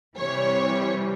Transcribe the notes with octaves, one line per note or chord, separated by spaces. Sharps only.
C3 E3 G3 C#5